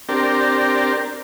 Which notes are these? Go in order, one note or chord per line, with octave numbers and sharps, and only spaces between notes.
C4 D4 G4 A#4